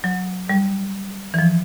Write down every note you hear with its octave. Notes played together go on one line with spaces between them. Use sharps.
F#3
G3
E3
F3